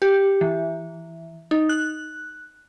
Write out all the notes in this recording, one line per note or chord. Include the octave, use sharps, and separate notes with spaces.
G4
E3
D#4
F#6